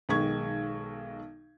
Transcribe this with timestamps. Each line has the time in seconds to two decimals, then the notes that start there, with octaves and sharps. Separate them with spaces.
0.09 B1 D#3 G#3 C#6 G#6